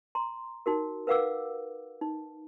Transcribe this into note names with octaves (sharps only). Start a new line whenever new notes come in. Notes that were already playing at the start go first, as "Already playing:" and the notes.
A#5 C6
D#4 F#4 A#4
A#4 B4 F5 F#5 D6 E6
D#4